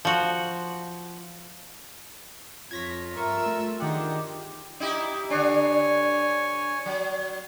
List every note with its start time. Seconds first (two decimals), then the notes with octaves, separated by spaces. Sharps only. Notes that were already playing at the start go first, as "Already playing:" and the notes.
0.05 F3 F#4
2.71 F2 F4 C#5 G#6 A#6 B6
3.17 G2 A#4 E5 C#6 E6
3.46 A3
3.80 D#3 D4 D#4 G4 G#4 F#5
4.80 D#4 E4 G4
5.30 D3 D4 C#5 G#5
6.86 F#3